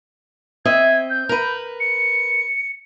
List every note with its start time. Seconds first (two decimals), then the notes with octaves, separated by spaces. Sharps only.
0.65 C4 D#5 E5 G#6
1.10 G6
1.29 A#4 B4
1.80 C#7